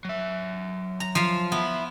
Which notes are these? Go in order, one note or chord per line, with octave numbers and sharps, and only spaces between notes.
F#3 E5
A#5
F3 F5
B3 E4